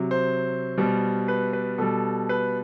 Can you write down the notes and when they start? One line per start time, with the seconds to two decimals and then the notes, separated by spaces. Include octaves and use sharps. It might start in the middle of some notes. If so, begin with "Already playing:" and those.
Already playing: C3 F#3
0.11 C5
0.78 B2 G3
1.28 B4
1.53 B4
1.78 B2 G3 A4
2.29 B4